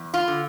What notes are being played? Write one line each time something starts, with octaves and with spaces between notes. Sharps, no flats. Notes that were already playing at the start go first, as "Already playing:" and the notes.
Already playing: E2
F4
D3